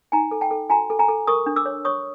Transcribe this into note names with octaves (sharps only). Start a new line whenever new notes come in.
D#4 G#5 A#5
A4
G5 A5
A4
F#4 G#5 A#5
A4
G#5 A#5
A4
A#4 C#6 D#6
D4
D6 E6
C#5
C#5 C#6 D#6